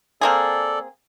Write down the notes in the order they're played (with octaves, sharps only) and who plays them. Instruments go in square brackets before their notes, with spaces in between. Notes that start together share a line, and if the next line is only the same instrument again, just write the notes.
[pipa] A#3 C4 G#4 [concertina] A4 D5